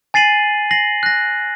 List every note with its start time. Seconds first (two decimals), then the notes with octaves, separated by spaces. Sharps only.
0.14 G#5 A6 C7 D#7 F#7
0.71 A#6 C7 F#7
1.03 F#6 A#6